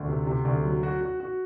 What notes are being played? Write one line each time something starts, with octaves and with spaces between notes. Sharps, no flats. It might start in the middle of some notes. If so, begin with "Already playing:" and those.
Already playing: D2
C3
C3
D2
F#3
F#4
F#4
F#4